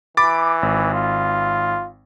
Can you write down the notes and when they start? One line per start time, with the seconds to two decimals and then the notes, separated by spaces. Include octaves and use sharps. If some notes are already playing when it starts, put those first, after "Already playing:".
0.17 E3 B5 D6 A6
0.63 G#1
0.94 F4